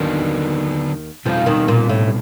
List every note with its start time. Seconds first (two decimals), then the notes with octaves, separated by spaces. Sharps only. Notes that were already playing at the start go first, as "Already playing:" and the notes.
Already playing: D#2 D3 D#3 F#3 B3 D4
1.25 F2 B2 F3 G3 C4 D#4
1.46 D#2 D#3
1.68 A#2
1.89 A2